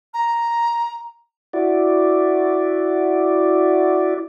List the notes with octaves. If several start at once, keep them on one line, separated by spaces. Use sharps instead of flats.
A#5
E4 F#4 D5